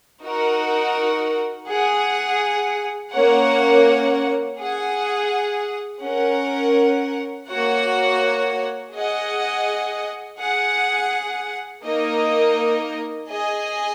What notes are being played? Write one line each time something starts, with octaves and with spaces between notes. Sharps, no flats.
D#4 F#4 A#4 F#5
G#4 F#5
A#3 C#4 A#4 C#5 F#5
G#4 F#5
C#4 A#4 F#5
A#3 F#4 C#5 F#5
G#4 D#5 F#5
G#4 F#5
A#3 D#4 A#4 D#5
G#4 D#5 G#5